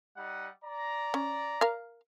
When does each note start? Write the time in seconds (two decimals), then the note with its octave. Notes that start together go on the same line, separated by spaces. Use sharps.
0.17 G3 D#4 F#5
0.64 D5 A#5
1.14 C#4
1.61 A#4 F5